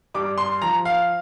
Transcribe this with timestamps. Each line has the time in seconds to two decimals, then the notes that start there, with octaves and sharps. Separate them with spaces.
0.14 G2 D6
0.38 C6
0.62 F3 A#5
0.85 F5